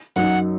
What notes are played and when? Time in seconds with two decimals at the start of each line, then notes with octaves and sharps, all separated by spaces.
0.16 F#2 F#3 D#4 F#5